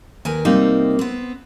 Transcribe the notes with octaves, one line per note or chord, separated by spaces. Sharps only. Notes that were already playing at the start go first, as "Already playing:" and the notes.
D#2 A#4 B4 G#5
C3 G3 A#3 C4 D#4
B3 C4